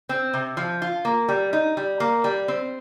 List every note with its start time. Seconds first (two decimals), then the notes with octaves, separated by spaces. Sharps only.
0.09 C4
0.33 C3
0.57 F3
0.82 F4
1.05 A#3
1.29 G3
1.53 D#4
1.77 G3
2.00 A#3
2.24 G3
2.48 C4